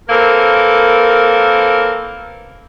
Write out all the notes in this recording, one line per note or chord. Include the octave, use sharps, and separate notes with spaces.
E3 A#3 C4 A4 A#4